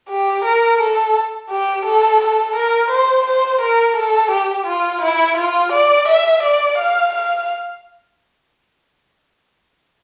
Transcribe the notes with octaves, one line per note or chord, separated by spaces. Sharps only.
G4
A#4
A4
G4
A4
A4
A#4
C5
C5
A#4
A4
G4
F4
E4
F4
D5
E5
D5
F5
F5